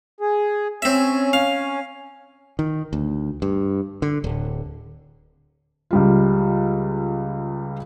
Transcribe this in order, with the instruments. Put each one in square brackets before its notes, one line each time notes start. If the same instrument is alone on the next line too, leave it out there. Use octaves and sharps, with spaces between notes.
[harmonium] G#4
[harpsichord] C4 E5 [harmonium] C#4
[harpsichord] F5
[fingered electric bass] D#3
D2
G2
D3
D1
[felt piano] C#2 G3 F4